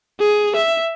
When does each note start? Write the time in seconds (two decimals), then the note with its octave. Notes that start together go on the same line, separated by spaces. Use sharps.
0.20 G#4
0.56 E5